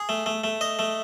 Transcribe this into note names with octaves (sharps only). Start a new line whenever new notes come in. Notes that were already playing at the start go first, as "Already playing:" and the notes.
Already playing: G#4
A3
A3
A3
D#5
A3